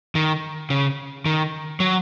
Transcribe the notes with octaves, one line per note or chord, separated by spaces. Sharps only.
D#3
C#3
D#3
F#3